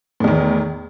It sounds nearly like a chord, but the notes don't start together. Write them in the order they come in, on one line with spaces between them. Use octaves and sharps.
A2 E2 D#3